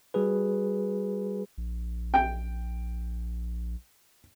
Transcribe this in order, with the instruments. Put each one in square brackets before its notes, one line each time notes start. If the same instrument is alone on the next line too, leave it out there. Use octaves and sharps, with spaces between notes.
[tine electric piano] G3 F#4 G#4 B4
[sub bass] A#1
[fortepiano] G5